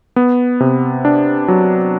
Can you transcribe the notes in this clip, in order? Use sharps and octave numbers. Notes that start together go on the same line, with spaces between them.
B3
C3
D4
F#3